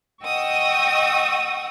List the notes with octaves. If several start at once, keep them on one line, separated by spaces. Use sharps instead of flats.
D#5 F#5 G5 C#6 D#6 E6